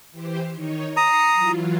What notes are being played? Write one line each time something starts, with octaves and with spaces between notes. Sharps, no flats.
E3 G4 C5
D#3 D#4 C#5
A#5 D#6 C7 C#7
E3 F#3 F4